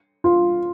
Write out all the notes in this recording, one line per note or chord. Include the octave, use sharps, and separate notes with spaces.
F4